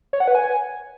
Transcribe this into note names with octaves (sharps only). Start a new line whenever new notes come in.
C#5
F#5
B4
G#5